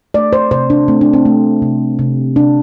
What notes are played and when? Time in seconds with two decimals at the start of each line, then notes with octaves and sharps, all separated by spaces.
0.14 A3 D5
0.33 C5
0.51 C3 C5
0.70 D4
0.88 A3 C4
1.01 D4
1.13 C4
1.25 A3
1.62 C3
1.99 C3
2.36 C3 D4